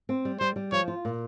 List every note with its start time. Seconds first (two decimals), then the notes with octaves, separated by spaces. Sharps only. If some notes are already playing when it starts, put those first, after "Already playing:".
0.09 C4
0.25 G3
0.40 G3 C5
0.56 G3
0.72 F3 C#5
0.88 F4
1.05 A#2